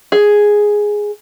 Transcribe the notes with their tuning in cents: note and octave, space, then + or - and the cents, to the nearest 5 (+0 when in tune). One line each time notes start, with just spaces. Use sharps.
G#4 +0